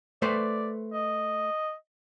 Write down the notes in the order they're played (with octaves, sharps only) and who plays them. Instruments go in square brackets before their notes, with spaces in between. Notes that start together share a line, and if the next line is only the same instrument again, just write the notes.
[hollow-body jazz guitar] A3 B4 C5 [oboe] D5
[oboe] D#5